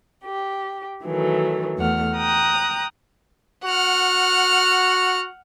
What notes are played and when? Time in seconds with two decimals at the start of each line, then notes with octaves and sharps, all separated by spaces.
0.23 G4
1.04 D#3 E3 F#3 A3
1.78 E2 A3 F#5 F6
2.16 G5 A#5 D#6 F#6
3.64 F#4 F#5 F6